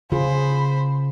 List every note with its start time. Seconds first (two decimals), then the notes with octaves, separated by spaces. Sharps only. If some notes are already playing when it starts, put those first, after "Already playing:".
0.12 C#3 F4 G#4 C5 B5